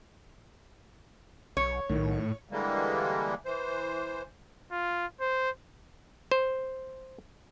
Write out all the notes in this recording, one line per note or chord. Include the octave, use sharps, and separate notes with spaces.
B1 C#5
B1 A2 D#3
D3 E3 G3 G#3 A#3
E3 C5
F4
C5
C5